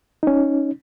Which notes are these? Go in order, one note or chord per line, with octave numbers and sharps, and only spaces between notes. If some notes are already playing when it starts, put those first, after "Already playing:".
C#4 D#4